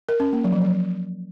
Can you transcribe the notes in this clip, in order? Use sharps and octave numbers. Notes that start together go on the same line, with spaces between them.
A#4
C#4
A#3
F#3
F3
F#3